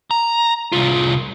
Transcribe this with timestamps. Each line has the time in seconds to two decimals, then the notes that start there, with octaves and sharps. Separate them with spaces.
0.11 A#5
0.72 C2 F4